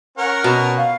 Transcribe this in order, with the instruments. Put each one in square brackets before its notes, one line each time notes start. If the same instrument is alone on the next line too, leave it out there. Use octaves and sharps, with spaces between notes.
[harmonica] C#4 F#5 [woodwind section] A#4
[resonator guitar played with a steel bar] B2
[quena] F5